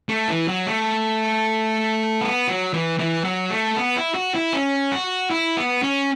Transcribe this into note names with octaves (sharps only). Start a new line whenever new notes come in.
A3
E3
F#3
A3
B3
F#3
E3
E3
F#3
A3
B3
E4
F#4
E4
C#4
F#4
E4
B3
C#4